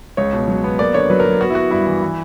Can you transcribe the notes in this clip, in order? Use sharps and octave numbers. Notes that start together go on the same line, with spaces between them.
C#2 C#5
B2
F#3
B3
A#3 D5
D3 C#5
F#3 B4
A#4
F#3
B3 F#4
E4
B3 F#4
G2 E4
E3
E3